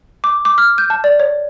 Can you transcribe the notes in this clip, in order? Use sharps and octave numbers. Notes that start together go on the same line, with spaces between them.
D6
D6
F6
G6
A5
D5
C#5